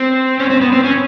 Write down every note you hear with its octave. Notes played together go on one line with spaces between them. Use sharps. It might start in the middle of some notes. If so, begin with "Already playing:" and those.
Already playing: C4
C#4
C4
B3
C4
C#4